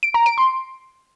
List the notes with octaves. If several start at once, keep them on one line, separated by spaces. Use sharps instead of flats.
D7
A#5
D7
C6